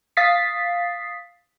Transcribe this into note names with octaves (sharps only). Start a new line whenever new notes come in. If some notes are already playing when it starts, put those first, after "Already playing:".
F5 D#6 A6 B6 C7